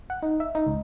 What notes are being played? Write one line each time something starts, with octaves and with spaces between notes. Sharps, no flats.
F#5
D#4
E5
D#4
C#2